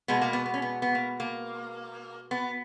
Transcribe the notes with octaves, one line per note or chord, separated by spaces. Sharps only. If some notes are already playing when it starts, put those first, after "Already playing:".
B2 G#3 B3
A#3
B3
B3
C#4
B3
B3
A#3
A#3
B3